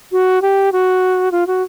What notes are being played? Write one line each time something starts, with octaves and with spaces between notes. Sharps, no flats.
F#4
G4
F#4
F4
F#4